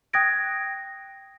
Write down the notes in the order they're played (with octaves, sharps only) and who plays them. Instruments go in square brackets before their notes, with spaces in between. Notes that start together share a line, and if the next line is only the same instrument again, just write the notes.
[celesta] G5 D#6 F#6 G#6 A#6 D7